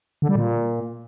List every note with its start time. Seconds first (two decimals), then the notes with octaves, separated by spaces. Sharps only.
0.22 D3
0.29 G3
0.36 A#2